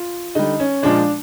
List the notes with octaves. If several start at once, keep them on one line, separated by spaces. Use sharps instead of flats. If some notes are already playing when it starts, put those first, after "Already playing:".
Already playing: F4
D3 G3 D#4
C#4
A#2 F3 G#3 D4